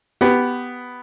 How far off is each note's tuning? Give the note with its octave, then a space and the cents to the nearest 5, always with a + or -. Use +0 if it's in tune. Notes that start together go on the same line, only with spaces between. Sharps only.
B3 +5 G4 +0